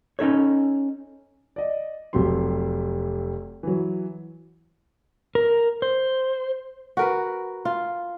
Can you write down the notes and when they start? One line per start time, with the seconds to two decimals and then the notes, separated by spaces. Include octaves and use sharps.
0.19 C#4 D#4 A4 C#5
1.56 D5 D#5
2.13 F1 F2 C3 F#3 G4 C6
3.63 E3 F#3
5.35 A#4
5.82 C5
6.97 F#4 A#4 B4
7.65 F4